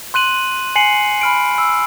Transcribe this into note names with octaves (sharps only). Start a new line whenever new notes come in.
C6 F#6 D#7 F#7
G#5 C7 C#7 D#7 F#7
B5 F6 D7
E6